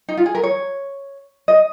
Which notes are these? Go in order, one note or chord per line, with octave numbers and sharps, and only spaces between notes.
D#4
F4
G#4
A#4
C#5
D#5